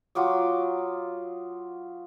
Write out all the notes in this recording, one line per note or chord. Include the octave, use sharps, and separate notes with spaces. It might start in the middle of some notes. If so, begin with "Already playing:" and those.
F#3 F4 D6 D#6